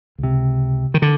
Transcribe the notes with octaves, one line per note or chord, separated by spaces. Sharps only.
C#2 C3
D#3
D3